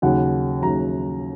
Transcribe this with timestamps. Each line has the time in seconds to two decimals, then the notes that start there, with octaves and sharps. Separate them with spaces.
0.02 D#2 C#3 F#3 F#5
0.62 D#2 C#3 F#3 A#5